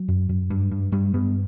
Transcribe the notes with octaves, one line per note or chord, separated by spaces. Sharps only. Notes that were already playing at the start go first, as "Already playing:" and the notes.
Already playing: F#3
F#2
F#2
G2
G2
G2 G3
G2 B3